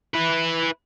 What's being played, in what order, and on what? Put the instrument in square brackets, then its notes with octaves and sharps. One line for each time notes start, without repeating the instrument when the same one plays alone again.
[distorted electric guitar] E4 B4